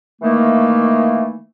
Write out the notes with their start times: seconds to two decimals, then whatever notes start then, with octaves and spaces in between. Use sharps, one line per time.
0.22 D#3 E3 A3 A#3